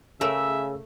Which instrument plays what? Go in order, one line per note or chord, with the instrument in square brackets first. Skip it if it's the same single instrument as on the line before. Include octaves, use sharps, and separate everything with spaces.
[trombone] C#3 [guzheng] A3 A#4 [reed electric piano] G#4 C#5 E6 [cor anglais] E5